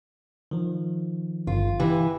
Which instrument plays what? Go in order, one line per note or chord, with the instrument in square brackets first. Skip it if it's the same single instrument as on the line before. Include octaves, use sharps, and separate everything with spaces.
[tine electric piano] D#3 F3
[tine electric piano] G1 [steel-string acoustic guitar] F4
[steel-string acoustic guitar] E3 [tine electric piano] G4